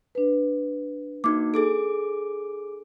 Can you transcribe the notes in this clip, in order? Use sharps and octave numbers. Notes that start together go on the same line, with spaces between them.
D4 B4
A#3 D#4 F#4 D6
G#4 A4 D6 D7